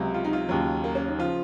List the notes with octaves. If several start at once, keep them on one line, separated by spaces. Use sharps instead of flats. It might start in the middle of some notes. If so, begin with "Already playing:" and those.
Already playing: C#2 C3 F#3
F4
D#4
F4
D#2 C#3 F#3
A#3
C#4
D#4
C#3 F3 F4